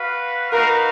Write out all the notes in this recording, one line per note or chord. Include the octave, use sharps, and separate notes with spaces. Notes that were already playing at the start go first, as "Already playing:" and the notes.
Already playing: F#4 B4 F5
D#4 F#4 A#4 B4 F5